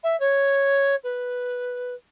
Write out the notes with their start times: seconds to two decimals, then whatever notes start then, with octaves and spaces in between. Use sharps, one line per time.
0.03 E5
0.20 C#5
1.03 B4